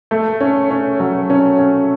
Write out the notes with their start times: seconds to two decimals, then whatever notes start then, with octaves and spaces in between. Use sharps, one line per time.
0.11 A3
0.40 C#4
0.70 C#4
1.00 F#3
1.30 C#4
1.59 C#4